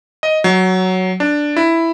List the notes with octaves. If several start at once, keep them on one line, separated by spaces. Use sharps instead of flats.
D#5
F#3
D4
E4